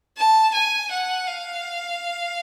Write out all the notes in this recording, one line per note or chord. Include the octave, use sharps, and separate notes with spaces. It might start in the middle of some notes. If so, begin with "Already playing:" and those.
A5
G#5
F#5
F5